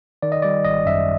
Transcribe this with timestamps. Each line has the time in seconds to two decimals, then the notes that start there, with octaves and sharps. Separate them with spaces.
0.22 D#3 D5
0.32 D#5
0.42 G3 D5
0.64 G#1 D#5
0.86 F#2 E5